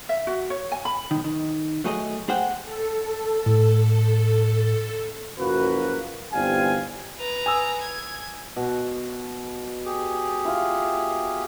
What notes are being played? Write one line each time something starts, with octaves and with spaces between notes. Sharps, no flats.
E5
F#4
C#5
G#5
B5
B1 D#3
D#3
F#3 A3 G#4 A4 D#5
A3 G#4 C5 F#5 G5
A4
A2
F#1 F#2 F3 A#3 F#4 B4
G1 E2 G3 C4 F5 G#5
B4 A#5
G#5 D#6 E6
G#6
B2
G4 G#4
E4 F4